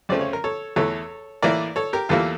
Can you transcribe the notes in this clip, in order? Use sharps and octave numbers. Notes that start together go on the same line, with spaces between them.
F2 C#3 F3 A3 D5
C#5
A#4
A4 C#5
E2 E3 A3 A4 C#5
A2 E3 A#3 A#4 D5
A4 C#5
G4 A#4
E2 E3 G3 A#3 F4 A4